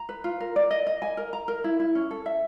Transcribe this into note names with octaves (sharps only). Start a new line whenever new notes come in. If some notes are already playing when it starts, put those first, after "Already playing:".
Already playing: A#5
B4
F4
A#4
D5
D#5
D#5
G#5
A#4
A#5
A#4
E4
E4
C#4
A4
E5